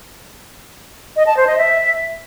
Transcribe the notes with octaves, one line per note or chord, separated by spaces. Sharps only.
D#5
A5
C5
D#5
E5